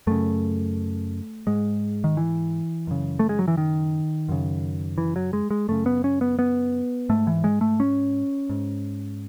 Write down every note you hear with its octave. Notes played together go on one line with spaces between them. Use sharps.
F#2 C#3 A3
G#2 G#3
D#3
E3
F#2 C#3
A3
G#3
F#3
E3
D#3
F#2 C#3
E3
F#3
G#3
G#3
F#2 C#3 A3
B3
C#4
B3
B3
G#2 A3
E3
G#3
A3
C#4
G#2